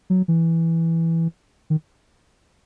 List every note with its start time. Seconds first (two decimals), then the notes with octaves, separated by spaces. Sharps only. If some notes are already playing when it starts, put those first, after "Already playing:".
0.10 F#3
0.28 E3
1.70 D#3